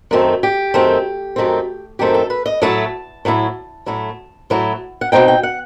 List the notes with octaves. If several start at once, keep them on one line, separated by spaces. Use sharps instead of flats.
F#2 D#3 A3 C4
G4
F#2 D#3 A3 C4
F#2 D#3 A3 C4
F#2 D#3 A3 C4 G4
A4
B4
D#5
A2 F#3 A3 E4 A5
A2 F#3 A3 E4
A2 F#3 A3 E4
A2 F#3 A3 E4
F#5
B2 A3 C4 D#4 G5
G5
F#5